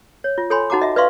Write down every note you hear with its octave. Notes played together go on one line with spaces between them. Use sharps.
C#5
F4
A4 C#5 G5 G#5 B5 C6
D#4 F#4 F#5 A5 A#5 D6
D#5 E5
B4 D5 E5 F5 C6 C#6